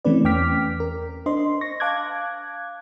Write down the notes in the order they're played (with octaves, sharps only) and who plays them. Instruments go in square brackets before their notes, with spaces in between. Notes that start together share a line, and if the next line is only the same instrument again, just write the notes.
[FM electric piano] E3 A3 C4 C#4 B4 D5
E2 C#4 G5 D6 F6 B6
A#4
D4 C5 D#5 C6
C#6 A#6
F5 A5 D6 F#6 G#6